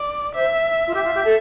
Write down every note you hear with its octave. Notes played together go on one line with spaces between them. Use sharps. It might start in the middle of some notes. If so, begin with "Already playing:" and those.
Already playing: D5
C5 E5
F4
G4 E5
F4
G4
A4